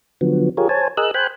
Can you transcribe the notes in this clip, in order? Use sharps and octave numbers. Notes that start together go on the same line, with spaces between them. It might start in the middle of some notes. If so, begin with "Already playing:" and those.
D3 F3 F#3 B3
F4 G4 G#4 A#4 C#5
C5 C#5 G#5 A5
G#4 A#4 D#5 E6 F#6
C5 G5 G#5 B5 F#6